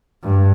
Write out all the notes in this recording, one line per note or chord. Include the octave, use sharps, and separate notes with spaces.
G2